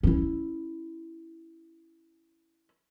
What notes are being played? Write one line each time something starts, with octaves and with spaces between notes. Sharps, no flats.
C#4 E4